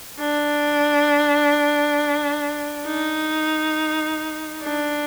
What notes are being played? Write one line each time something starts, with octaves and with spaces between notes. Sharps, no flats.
D4
D#4
D4